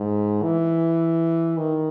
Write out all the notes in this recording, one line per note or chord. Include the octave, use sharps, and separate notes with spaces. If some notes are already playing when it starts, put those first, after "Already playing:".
Already playing: G#2
E3
D#3